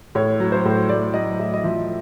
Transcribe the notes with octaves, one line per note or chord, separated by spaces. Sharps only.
A2 C#5
F#3
C5
A2
A2 D5
F#3 D#5
A2 E5
D#5
F3 E5